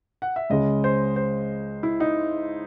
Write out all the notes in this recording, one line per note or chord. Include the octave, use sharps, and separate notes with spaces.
F#5
E5
C#2 C#3 G#3 D#5
C5
C5
E4
D#4